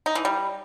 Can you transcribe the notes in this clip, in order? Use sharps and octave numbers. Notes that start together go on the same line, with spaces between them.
D#4
E3
G3